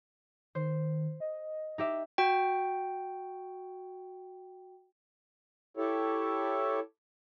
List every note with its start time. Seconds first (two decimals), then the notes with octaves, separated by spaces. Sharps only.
0.55 D#3 C5
1.20 D#5
1.78 D#4 G4 E5
2.18 F#4 G5
5.77 E4 G4 A4 C#5